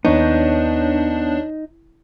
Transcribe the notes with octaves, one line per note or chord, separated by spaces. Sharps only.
D#2 B3 D4 D#4 C#5 G6